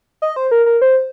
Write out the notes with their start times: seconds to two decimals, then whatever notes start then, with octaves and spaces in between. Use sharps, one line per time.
0.22 D#5
0.36 C5
0.51 A#4
0.66 A#4
0.82 C5